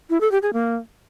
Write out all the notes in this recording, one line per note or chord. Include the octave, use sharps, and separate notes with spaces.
E4
A4
G4
G#4
A#3